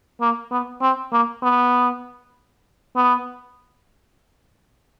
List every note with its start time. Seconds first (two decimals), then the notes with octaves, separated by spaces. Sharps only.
0.21 A#3
0.51 B3
0.82 C4
1.12 A#3
1.43 B3
2.96 B3